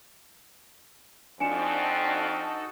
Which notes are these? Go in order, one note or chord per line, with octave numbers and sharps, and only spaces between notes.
F2 D4 D#4 F#4 A4 G#5 C#7 E7